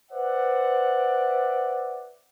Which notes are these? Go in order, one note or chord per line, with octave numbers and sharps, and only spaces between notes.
B4 C5 D5 E5 F#5